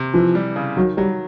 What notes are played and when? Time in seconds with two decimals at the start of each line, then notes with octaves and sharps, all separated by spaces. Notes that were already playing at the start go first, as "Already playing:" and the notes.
Already playing: C3
0.14 E3 F3
0.35 G3
0.56 C#3
0.77 D#3 F#3
0.97 F#3 G3